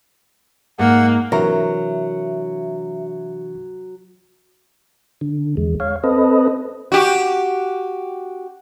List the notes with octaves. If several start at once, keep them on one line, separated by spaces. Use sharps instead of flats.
G#2 A#3 F#5
C3 E3 F#3 D4 A#4 E5 F#5 A#5
D3
E2 G#3
C#5 F5
C4 A4 B4 D#5
F#4 G4